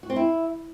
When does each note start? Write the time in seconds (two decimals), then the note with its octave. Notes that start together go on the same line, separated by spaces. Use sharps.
0.03 F#4
0.10 C4
0.16 E4